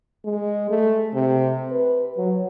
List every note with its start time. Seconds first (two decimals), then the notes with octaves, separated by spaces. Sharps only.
0.24 G#3
0.70 A3
1.14 C3
1.72 B4
2.17 F#3